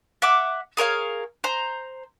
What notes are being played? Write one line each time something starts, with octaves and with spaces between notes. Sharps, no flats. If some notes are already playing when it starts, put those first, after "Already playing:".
E5 F#5 D6
G#4 A#4 C#5 F5
C5 A#5